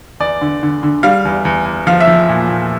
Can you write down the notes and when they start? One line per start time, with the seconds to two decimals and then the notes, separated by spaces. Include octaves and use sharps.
0.20 E2 D5
0.41 D3
0.63 D3
0.83 D3
1.03 G3 F5
1.25 E2
1.45 E2
1.65 E2
1.87 F3 F5
2.00 E5
2.07 F3
2.29 A#2
2.48 A#2